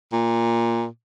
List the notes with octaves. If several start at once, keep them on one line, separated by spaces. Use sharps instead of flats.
A#2